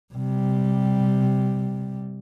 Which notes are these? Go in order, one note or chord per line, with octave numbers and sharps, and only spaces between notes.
C3 G3